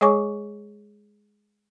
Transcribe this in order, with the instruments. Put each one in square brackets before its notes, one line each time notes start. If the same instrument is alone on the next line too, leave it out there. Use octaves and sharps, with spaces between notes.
[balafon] G#3 G#4 C#5 G#5 C#6 D6